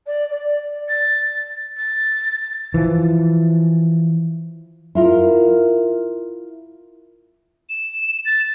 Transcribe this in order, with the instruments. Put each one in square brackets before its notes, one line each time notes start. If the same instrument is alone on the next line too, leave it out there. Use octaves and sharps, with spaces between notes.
[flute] D5
D5
A6
A6
[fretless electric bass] E3 F3
[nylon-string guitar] E4 F4 A#4
[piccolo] E7
A6